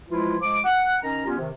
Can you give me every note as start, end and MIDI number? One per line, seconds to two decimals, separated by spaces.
0.11 0.36 52
0.11 0.36 53
0.11 0.36 56
0.11 0.36 64
0.11 0.36 65
0.40 0.60 53
0.40 0.60 56
0.40 0.60 86
0.64 0.94 78
1.02 1.25 51
1.02 1.25 61
1.02 1.25 82
1.26 1.37 55
1.26 1.37 59
1.26 1.37 61
1.26 1.37 65
1.38 1.49 48
1.38 1.49 51